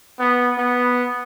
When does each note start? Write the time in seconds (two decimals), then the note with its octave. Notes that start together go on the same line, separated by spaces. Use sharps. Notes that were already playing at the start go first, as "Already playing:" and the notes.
0.20 B3
0.58 B3